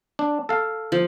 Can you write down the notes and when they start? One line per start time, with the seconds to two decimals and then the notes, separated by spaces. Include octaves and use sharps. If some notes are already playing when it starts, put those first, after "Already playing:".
0.19 D4
0.49 A4 F5
0.92 F3